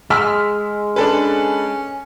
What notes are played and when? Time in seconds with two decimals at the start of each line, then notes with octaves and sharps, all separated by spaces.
0.10 G#3 E6 F6 B6
0.96 C#4 D4 A4 B4